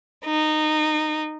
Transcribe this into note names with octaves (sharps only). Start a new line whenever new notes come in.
D#4